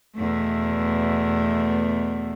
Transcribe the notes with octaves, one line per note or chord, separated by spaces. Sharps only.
E2 B2 A3